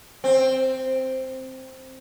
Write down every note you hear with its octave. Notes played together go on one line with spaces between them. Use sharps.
C4